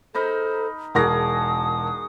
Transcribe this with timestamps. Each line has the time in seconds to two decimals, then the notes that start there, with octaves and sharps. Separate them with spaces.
0.15 D#4 A4 A#4 C5 B5
0.95 E1 F#4 G#4 A#4 A5 D#6 A#6